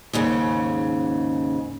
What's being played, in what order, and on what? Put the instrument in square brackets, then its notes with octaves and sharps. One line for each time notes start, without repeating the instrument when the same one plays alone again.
[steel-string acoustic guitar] D#2 G#2 C#3